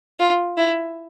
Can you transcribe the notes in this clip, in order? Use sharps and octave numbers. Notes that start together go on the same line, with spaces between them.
F4
E4